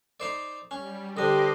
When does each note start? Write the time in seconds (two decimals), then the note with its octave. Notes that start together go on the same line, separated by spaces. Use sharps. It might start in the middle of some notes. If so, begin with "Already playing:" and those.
0.20 D#4 C5 D5
0.71 G3 C#4
1.17 D3 D4 G4 B4 C5 D#5 C6 D6